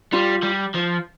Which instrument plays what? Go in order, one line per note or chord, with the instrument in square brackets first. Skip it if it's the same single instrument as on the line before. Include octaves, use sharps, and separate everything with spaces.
[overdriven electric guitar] G3 [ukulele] F4
[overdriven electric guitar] G3
F3